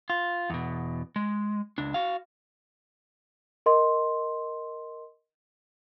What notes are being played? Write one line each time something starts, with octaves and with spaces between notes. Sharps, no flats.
F4
E2 B2
G#3
C#2 D4
F#4 F5
A#4 D#5 C6